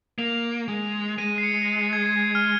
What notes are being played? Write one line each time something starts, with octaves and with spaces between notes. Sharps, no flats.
A#3 F7
G#3
G#3 D#7
C7
C#7
C#7
C7
G#6
G#6
F6